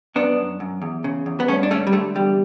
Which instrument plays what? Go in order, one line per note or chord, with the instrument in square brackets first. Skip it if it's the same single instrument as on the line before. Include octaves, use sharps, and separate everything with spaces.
[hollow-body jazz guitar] F#2 B3 D4
F#2
F#2
E2
C#3
E2
B3
G2 A3 C#4
D4
D3 A3 C#4
G3
D3 A3
E2 G3